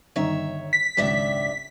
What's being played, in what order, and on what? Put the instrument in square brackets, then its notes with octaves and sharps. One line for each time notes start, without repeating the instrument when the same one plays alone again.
[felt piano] G1 D#3 D#4 [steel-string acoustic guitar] C#5 E5
[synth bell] B6
[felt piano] G#1 C#2 [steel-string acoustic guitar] F#2 D4 E5